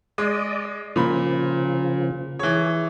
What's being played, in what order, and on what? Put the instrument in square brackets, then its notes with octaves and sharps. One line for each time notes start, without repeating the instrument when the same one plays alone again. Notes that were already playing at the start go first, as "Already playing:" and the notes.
[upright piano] G#3 [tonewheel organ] D5 D#5
[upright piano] A#2 B5 [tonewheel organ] C#3 F3
[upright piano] E3 C#5 [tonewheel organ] G#4